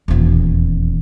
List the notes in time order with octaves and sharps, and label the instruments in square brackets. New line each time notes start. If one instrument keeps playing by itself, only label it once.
[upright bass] D#1 E2